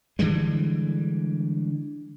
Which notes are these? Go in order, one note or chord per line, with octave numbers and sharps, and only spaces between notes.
D3 E3 G3 G#3